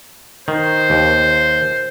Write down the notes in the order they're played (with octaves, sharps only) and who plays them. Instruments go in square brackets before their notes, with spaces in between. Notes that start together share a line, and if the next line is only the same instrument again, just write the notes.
[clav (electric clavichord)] D#3 [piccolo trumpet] C5
[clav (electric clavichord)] D#2